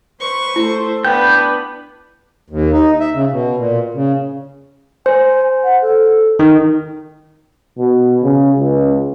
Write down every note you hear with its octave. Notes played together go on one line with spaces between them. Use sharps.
B4 C5 C#6
A3 E4 C5
B3 D4 B4 F5 G5 G6
D#2
D#4
E5
C#3
B2
A#2
C#3
C5 G#5
F#5
A4
D#3
B2
C#3
C#2